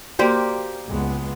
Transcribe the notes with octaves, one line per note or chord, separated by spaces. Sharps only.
A#3 F#4 G4 C5 D5 G5
C#2 G#3 B3